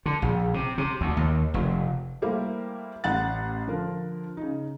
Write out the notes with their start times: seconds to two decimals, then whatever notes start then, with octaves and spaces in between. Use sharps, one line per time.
0.06 D3
0.22 A#1
0.54 C3
0.78 C3
1.01 D2
1.17 D#2
1.54 F1
2.22 G3 A3 A#3 E4 G4 C5
3.04 A1 A2 F#5 F#6 A6
3.67 D3 F3 A#4
4.37 C#3 D#4